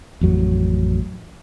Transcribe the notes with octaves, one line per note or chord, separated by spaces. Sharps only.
A1 F2 F#3